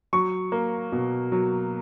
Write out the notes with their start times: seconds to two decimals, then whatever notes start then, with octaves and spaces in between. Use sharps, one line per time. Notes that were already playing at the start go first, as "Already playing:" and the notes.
0.13 F#3 C#6
0.52 A#3
0.92 B2
1.32 F#3